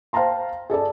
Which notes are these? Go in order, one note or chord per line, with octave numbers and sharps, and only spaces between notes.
C5 F5 G5 A5 A#5 C6
G#4 A4 D5 A5